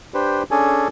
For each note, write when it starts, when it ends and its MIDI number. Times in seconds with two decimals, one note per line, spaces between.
0.14 0.43 62
0.14 0.43 67
0.14 0.43 71
0.14 0.43 72
0.51 0.88 61
0.51 0.88 62
0.51 0.88 68
0.51 0.88 69
0.51 0.88 80